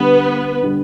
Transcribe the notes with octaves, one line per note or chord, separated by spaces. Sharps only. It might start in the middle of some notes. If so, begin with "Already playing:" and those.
Already playing: D3 G3 B3 D4 G4 B4
D3 G3 D4 G4